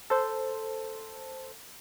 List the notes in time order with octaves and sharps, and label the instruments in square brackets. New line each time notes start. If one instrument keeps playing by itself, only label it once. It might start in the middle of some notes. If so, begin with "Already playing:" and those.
[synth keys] A4 C5